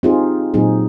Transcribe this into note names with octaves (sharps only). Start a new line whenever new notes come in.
C4 D#4 F4 G4 G#4
A#2 F#3 C4 D#4 G#4